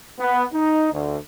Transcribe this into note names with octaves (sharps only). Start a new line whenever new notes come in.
B3
D#4
D2